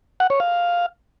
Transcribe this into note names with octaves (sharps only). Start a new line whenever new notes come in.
F#5
C#5
F5